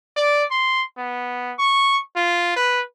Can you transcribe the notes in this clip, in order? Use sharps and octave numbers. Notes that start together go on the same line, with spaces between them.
D5
C6
B3
C#6
F4
B4